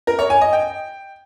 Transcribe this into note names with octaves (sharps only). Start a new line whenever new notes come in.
A#4
C#5
G#5
D#5
G5